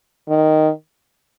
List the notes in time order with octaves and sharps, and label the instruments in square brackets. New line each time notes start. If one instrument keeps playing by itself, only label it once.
[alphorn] D#3